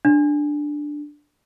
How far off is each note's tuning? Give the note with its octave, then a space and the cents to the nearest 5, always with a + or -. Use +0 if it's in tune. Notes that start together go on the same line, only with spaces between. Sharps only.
D4 +5